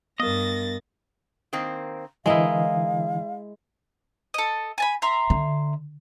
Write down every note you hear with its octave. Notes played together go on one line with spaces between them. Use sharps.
G2 B3 A#4 D#5 A6 A#6
D#3 A#3 C4
D3 E3 G#3 E4 A#4 D#5 F5
A4 D#5
G#5 A5 B5
E5 A#5 C6
D3